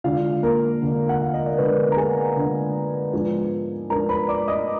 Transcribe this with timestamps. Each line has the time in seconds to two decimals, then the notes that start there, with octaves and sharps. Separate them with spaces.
0.04 D3 G#3 D4 F4 F5
0.43 A#3 A#4
0.81 D3 G#3 D4
1.09 F#5
1.22 F5
1.34 D#5
1.46 D5
1.58 D3 G#3 B3 D4 B4
1.92 A#5
1.97 G#4 G#5
2.36 D3 G#3 D4
3.13 G#2 F3 B3 D4
3.90 G#2 F3 B3 D4 A#4 A#5
4.09 B4 B5
4.28 D5 D6
4.48 D#5 D#6